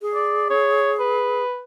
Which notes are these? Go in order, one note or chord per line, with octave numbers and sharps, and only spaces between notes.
G#4
D5
C#5
B4